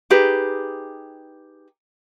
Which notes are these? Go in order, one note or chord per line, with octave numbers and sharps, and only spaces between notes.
D#4 G4 G#4 B4